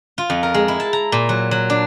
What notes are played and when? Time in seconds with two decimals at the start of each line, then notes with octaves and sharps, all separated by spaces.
0.18 F4
0.30 F2
0.43 A#4
0.54 G#3
0.68 E4
0.80 A5
0.93 A#5
1.12 A#2
1.29 F#3
1.51 F#3
1.70 D4